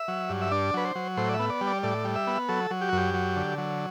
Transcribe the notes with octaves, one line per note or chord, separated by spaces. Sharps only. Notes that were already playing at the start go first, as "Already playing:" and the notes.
Already playing: E5
F#3
G2
E5
D4 D5
F#3 B4
C5
F#3
A2 C5
D5
E5
B3
D5
G3
D5
A2 D5
G3
E5
B3
F#3 A4
F#3
G4
F#4
F#2 G4
F#3
D3
F#3